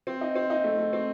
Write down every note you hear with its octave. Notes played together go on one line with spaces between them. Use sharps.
C4
D#4
C4
D#4
A3
A3
C4